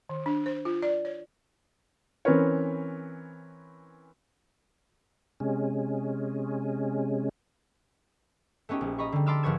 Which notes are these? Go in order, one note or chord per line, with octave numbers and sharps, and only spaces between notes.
D#3
D4
C5
F4
D5
C#5
E3 C4 C#4 A#4 B4 C#5
C3 G#3 C#4
A3 B3 C#4 D#4 G4
A#1
D#5 A#5 B5 C#6
D3 G3
A5 B5 C6 D6 E6 F6
G#1 F3 B4 C#5 G#6 E7